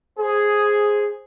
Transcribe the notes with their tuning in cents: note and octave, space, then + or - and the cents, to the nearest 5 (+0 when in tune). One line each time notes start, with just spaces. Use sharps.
G#4 +0 C5 +5